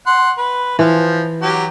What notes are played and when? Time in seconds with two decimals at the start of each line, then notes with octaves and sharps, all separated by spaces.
0.06 F#5 C6
0.38 B4
0.79 E3 F3
1.42 F#3 G4